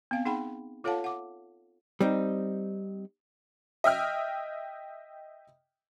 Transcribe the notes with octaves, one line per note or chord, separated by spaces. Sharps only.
B3 C4 F5
D#4 G#4 F#5 G5 B5
F4 A4 C#5 F5 F#5 A5
F#5 D6
G3 C4 D#4
D#5 E5 G5 F6